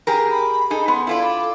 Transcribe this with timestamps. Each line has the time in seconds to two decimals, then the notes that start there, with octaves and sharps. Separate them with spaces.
0.07 G4 G#4 A#4
0.31 B5
0.70 D#4 G#4 A4
0.88 B3 C6
1.07 E4 F4 A4 D5